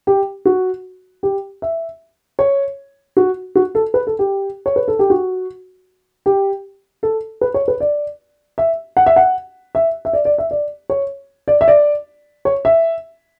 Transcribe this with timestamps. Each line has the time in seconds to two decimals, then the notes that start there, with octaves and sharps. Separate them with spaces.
0.07 G4
0.45 F#4
1.23 G4
1.62 E5
2.39 C#5
3.17 F#4
3.55 F#4
3.75 A4
3.94 B4
4.07 A4
4.19 G4
4.66 C#5
4.76 B4
4.88 A4
4.99 G4
5.10 F#4
6.26 G4
7.03 A4
7.41 B4
7.54 C#5
7.68 B4
7.80 D5
8.58 E5
8.97 F#5
9.07 E5
9.16 F#5
9.75 E5
10.05 E5
10.13 D5
10.25 D5
10.38 E5
10.51 D5
10.90 C#5
11.48 D5
11.61 E5
11.68 D5
12.45 C#5
12.65 E5